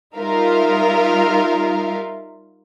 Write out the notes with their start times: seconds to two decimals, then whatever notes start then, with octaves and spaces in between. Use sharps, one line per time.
0.17 G3 D#4 F4 A#4 E5 F5